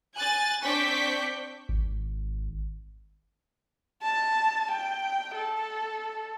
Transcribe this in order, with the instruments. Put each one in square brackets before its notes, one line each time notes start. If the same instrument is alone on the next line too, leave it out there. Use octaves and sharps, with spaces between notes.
[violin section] G#5 F#6 A6
C4 D4 C#6 D6 G6 B6
[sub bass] G#1
[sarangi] A5
G5
A4